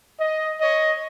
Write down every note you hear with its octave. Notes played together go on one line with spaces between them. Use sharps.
D#5
C#5 D#5